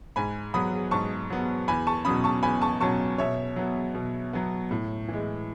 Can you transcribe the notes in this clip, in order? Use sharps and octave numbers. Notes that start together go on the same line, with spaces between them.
G#2 G#5 B5
F#3 B3 B5 D#6
G#2 A5 C#6
F#3 B3
E2 G#5 B5
A5 C#6
B2 F#3 C#4 B5 D#6
A5 C#6
E2 G#5 B5
A5 C#6
B2 F#3 C#4 A5 C#6
B2 C#5 E5
F#3 B3
B2
F#3 B3
A2
E3 G#3